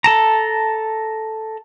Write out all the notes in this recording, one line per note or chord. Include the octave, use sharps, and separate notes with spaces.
A4 A5 A#5